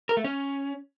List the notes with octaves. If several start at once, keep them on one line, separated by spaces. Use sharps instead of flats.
A#4
A3
C#4